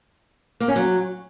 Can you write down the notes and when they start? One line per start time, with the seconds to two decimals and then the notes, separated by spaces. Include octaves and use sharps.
0.60 A#3
0.68 C#4
0.76 F#3